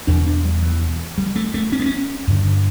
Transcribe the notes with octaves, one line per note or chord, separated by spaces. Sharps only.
E2 B2 D4
D4
G3
E3
G3
A3
A3
C#4
B3
C#4
G2 D3